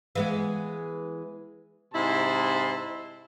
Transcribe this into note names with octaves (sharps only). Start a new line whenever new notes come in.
E3 G#3 B3
G#2 C3 E4 A5 C6